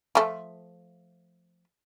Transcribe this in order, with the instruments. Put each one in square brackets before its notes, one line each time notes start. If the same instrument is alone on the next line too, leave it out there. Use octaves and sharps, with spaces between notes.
[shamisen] F3 A3